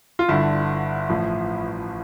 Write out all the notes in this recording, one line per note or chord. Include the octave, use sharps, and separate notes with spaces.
F4
G1 G2 D3 E4
A1 A2 F3